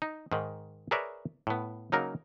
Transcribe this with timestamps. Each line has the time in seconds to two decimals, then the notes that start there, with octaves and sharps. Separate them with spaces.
0.02 D#4
0.32 G#2 D#3
0.91 G#4 A#4 B4 C#5 D5 E5
1.47 A2 B3
1.92 C#3 F#3 A#3 D#4 A#4